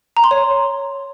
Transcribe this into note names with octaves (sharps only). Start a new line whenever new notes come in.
A#5
C6
C#5